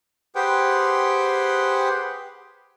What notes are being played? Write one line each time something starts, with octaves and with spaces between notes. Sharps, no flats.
G4 G#4 B4 C5 F#5 G5